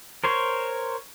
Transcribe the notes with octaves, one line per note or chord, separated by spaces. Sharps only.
A#4 C5 C#5